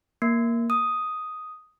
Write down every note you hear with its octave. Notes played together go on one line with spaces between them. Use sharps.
A#3
D#6